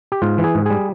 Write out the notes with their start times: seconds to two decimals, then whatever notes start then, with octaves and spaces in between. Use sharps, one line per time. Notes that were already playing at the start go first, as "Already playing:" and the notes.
0.12 G4
0.22 G#2 F4
0.38 E3
0.44 G#4
0.55 G#2
0.66 G3 G#4